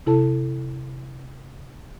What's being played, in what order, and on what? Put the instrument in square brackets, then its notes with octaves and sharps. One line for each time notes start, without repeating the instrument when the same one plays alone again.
[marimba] C3 E4 A4 A5